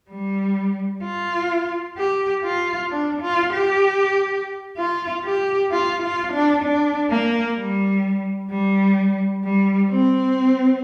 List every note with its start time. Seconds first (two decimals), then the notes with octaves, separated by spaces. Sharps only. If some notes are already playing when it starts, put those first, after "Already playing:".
0.10 G3
1.04 F4
1.98 G4
2.44 F4
2.91 D4
3.22 F4
3.53 G4
4.77 F4
5.24 G4
5.71 F4
6.02 F4
6.33 D4
6.64 D4
7.10 A#3
7.57 G3
8.51 G3
9.44 G3
9.91 C4